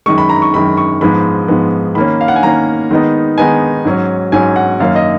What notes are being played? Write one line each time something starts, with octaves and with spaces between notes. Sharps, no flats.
F#2 D#3 G#3 C#6
B5
A#5
C#6
F#2 D#3 G#3 B5
C#6
G#2 F3 G#3 B3 B5
G#2 F3 G#3 B3
D#3 A#3 C#4 B5
F5
F#5
G#5
D#3 A#3 C#4 A#5
D#3 G#3 B3 D#4
D#3 G#3 B3 D#4 G#5
G#2 F#3 C#4
G#2 F#3 C#4 G#5
F#5
F#2 D#3 A#3 C#4 F5
D#5